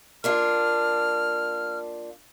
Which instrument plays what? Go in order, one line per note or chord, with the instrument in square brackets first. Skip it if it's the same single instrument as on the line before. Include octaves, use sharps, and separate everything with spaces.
[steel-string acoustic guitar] A#3 D4 F4 [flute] F6